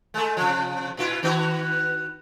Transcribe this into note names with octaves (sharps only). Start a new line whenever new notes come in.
G#3 A3
C3 F3
A#2 E4 F4
D#3 B3 F#4